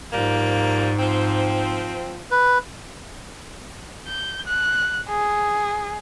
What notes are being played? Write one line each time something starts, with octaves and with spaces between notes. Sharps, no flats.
G#2 F3 G3 A#3
F3 C4
B4
G6
F#6
G#4